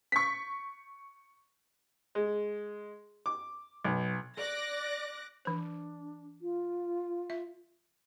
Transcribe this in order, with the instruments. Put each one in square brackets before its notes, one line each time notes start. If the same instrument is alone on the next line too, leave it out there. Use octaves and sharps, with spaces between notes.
[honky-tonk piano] C#6 B6
[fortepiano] G#3
D6
B1
[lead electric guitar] D5 [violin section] D6 F#6 A#6
[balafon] E3 C5 [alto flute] D4
[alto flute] F4
[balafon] E5